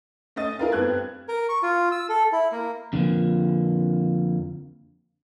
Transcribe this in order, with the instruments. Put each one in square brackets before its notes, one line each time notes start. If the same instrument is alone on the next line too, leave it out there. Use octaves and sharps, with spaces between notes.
[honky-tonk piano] A3 C#4 D#5 A6 D#7
E4 G#4 A#4 B4 F5
G2 B3 C4 A4 F#6 G#6
[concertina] A#4
C#6
F4
E6
A4
E4
A#3
[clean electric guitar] F2 D3 F3 G#3 A#3